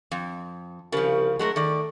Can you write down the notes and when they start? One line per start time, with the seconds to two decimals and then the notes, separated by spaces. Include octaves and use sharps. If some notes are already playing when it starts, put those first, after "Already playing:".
0.11 F2
0.92 C2 C#3 F3
1.39 F#3 G#3 A3 A#4
1.56 D#3 A3 D5